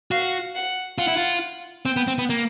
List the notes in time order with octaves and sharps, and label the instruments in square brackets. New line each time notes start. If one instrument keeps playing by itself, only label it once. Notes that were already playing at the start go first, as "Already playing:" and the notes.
[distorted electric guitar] F#4 [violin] F5
[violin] F#5
[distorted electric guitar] F4 [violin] F#5
[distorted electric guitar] E4
F4
[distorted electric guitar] C4 [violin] G5
[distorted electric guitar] B3
C4
B3
A#3